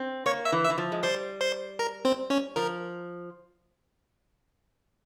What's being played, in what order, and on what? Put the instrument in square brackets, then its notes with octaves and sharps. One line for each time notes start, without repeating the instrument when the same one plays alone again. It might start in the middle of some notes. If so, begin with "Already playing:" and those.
Already playing: [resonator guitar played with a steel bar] C4
[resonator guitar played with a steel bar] A#3 [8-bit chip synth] C#5 C#6
[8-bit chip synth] E5 E6
[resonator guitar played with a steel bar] E3
[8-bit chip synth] E5 E6
[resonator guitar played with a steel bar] E3
F3
G#3
[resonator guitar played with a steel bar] G3 [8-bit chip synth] C5 C6
[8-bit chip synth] C5 C6
A#4 A#5
C4 C5
C#4 C#5
[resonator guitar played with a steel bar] F3 [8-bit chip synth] A#4